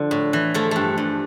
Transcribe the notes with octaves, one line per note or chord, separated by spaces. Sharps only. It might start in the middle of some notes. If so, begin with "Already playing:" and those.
Already playing: D3 F3
A2
E3
F3 A3
G2 A3
G2